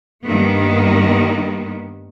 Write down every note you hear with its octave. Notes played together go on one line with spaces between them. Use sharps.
G2 D#3 A#3 B3